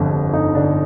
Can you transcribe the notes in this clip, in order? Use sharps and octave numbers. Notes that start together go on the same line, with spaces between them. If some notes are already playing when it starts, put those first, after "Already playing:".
Already playing: G1 F2 D3
G1
G1 D#4
D3 D4